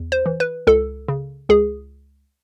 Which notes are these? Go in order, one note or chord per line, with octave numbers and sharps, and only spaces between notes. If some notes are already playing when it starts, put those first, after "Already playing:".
Already playing: E2
C5
E3
B4
C#2 A4
C#3
C#2 G#4